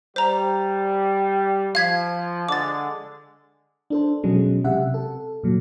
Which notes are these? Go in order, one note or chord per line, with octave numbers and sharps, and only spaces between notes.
G3 C5 A#5
F3 F5 G#6 B6
D3 G#3 D6 A6
D4 A4 C5
B2 F#3 G#3 C#4
C3 G4 E5 F#5
A4
A#2 F#3